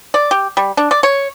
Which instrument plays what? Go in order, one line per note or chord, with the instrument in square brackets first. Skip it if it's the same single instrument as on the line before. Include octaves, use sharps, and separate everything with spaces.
[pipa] D5
G4
G3
D4
D5
C#5